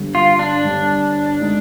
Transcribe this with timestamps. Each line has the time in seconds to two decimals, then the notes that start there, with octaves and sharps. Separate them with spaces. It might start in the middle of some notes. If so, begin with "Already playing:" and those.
Already playing: G1 G2 D3
0.15 F4
0.39 D4
0.64 G1 G2 D3
1.41 D3 G#3 D#4